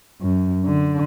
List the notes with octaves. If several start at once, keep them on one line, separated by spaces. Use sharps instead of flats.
F#2
D3